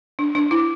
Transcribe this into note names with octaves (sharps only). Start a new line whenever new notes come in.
D4
D4
E4